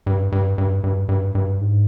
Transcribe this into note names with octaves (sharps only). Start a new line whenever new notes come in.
G2
G2
G2
G2
G2
G2
G#2